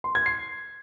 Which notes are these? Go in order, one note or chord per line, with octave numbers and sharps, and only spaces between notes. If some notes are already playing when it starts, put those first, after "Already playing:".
C6
G#6
C7